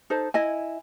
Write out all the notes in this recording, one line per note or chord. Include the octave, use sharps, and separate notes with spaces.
D#4 A4 C5
E4 D#5 G#5